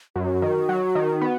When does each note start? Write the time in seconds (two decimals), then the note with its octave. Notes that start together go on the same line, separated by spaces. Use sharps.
0.16 F#2 F#4
0.42 D#3
0.69 F#3
0.95 D#3
1.21 B3